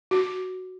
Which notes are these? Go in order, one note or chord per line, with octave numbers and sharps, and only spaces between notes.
F#4